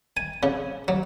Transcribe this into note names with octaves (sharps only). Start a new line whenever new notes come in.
G#5
C#3
F#3